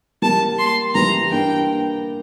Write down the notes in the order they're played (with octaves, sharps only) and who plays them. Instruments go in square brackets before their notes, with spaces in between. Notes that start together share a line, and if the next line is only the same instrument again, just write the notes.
[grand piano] G3 A#3 [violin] A5
[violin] C6
[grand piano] E3 G3 [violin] A#5
[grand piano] A#3 D4 [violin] G5